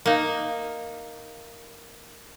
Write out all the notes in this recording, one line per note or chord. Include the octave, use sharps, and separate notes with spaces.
A#3 D#4